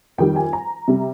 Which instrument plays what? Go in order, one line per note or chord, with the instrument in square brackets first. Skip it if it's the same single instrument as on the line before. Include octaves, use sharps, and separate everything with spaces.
[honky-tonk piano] F2 D#3 G3 G5
G#5
A#5
C3 G3